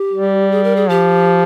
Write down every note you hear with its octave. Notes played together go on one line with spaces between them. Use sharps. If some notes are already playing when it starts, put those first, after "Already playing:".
Already playing: G4
G3
G#4
A#4
G#4
F3 G4